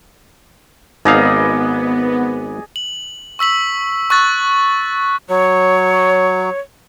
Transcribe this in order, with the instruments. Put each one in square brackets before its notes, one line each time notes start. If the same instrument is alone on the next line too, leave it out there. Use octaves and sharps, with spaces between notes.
[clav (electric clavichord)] G#1 D#4 F5 [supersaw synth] B3 [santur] G#4 D5 D#5
[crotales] F#7
C#6 E6 B6 F#7
C#6 F#6 A6
[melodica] F#3 [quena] C#5